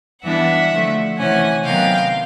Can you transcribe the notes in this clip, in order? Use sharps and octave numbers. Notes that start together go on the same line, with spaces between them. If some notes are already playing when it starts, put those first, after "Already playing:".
E3 G3 B3 D4 E5 F#5
D3 F3 A3
C3 E3 A3 C#4 F#5 G#5
C3 D#3 F#3 B3 F5 G5